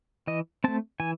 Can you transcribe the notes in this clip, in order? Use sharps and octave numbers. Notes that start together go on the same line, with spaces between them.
E3 D#5
A3 C4 A5
E3 G#5